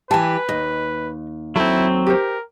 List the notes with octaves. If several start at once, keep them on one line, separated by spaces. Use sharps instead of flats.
E3 G4 B4 G#5 A5
D#2 D#5
F#3 C4 E4 A4
G4 A#4 C5